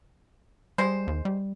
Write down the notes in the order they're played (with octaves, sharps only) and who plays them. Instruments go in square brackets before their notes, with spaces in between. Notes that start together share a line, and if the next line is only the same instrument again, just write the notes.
[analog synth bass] G3 [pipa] G#3 C5
[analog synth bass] D#2
G3